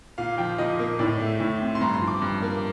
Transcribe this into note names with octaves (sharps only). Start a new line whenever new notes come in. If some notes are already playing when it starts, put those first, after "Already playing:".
A#2 F5
F3 G5
A#2 D#5
A#3
A2 D5
A3
A2
C4
C6
G2 A#5
C6
F3
D6
G2
A#3